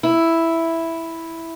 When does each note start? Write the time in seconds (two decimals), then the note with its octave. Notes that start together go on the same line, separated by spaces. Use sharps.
0.03 E4